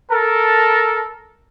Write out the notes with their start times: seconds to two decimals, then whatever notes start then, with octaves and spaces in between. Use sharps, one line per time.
0.11 A4 A#4 A5